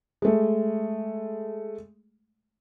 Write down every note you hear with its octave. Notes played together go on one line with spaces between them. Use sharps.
G#3 A3